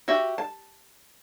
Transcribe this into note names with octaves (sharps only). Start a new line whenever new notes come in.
F#4 G4 E5
A5